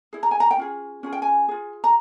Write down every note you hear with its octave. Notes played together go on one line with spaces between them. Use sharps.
E4 G#4
A#5
G#5
A#5
G5
C#4 F4 G#4
C#4 F4 G#4
G5
G#5
F4 G#4
A#5